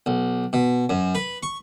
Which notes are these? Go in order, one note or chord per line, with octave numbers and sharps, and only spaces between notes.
B1
B2
F#2
B4
C#6